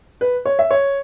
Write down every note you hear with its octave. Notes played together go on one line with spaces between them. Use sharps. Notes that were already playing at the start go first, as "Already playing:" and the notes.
B4
C#5
E5
C#5